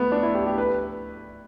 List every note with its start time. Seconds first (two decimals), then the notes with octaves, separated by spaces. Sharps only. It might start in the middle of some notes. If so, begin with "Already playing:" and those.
Already playing: A3 B3
0.12 D4
0.23 E4
0.35 G4
0.46 G4
0.58 B4